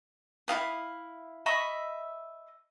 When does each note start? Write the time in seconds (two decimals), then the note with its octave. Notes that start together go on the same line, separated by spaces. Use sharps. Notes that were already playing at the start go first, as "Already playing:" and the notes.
0.48 E4 F#4 F5 D#6
1.46 D#5 E5 B5 C#6